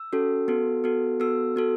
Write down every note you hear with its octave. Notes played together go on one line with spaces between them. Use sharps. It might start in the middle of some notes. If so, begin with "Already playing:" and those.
Already playing: E6
C#4 F#4 A4
B3 F#4 A4
B3 F#4 A4
B3 F#4 A4 E6
B3 F#4 A4